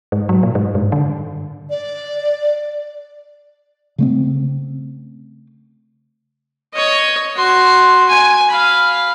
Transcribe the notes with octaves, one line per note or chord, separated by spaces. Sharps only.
G#2
F#3
A#2
G#2
G2
D3
D5
C#3 A3 C4
C#5 D#5
F#4 C6
G#5
F5 B5